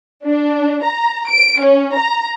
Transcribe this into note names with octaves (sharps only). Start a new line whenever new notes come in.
D4
A#5
D7
C#4
A#5